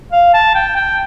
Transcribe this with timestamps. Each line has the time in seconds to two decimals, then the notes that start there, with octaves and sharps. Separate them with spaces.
0.12 F5
0.34 A5
0.54 G5
0.76 G5